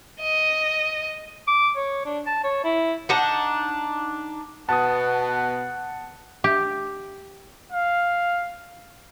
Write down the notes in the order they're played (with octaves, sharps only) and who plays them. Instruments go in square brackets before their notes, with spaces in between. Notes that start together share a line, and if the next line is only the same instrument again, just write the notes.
[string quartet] D#5
[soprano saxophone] D6
C#5
D4
A5
C#5
E4
[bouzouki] D4 D#4 F#5
[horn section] B2 B3 [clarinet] F#5 [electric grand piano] A5 D#6
[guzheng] G4
[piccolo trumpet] F5